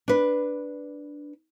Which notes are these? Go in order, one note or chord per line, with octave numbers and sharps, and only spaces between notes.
D4 B4